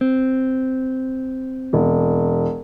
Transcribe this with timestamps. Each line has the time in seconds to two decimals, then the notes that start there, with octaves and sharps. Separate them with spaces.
0.01 C4
1.73 E1